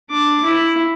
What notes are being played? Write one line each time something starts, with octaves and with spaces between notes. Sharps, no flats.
D4 D6
E4